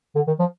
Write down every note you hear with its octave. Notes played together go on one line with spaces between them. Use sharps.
D3
D#3
F3